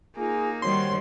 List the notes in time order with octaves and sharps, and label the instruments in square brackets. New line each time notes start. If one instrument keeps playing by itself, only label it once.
[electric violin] A#3 D#4 [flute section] F4 G#4 G#5
[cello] D#3 G3 [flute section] F#4 C5 C#5 [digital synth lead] C6